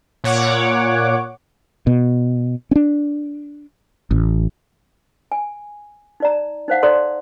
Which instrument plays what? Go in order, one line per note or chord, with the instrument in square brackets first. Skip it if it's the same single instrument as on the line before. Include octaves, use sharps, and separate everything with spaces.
[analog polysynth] A#2 C#5 F#5 D6
[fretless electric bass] B2
C#4 D4
A1
[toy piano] G#5
D#4 D5 A#5
D#4 C5 F5 F#5
D#4 A4 C5 D5 A#5 C6